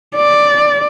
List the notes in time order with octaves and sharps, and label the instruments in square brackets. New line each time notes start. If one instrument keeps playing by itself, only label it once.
[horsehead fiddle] D5